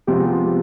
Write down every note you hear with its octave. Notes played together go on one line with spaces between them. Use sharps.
C3 F3 G#3 B3 F4 G4